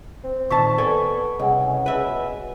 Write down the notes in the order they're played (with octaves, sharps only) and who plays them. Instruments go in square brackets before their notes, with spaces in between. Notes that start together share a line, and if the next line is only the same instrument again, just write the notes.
[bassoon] C4
[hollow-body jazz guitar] A#2 D#3 A5 [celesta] C#6 B6
[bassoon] B3 [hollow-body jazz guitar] A4 D5 G#5
[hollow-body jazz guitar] C2 [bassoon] C#3 [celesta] D#5 F#5 G#5
[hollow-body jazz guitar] B4 E5
[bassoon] B2